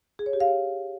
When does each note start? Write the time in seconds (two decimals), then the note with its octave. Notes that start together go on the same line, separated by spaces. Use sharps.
0.19 G#4
0.26 C#5
0.33 G4
0.40 F5
0.48 C#5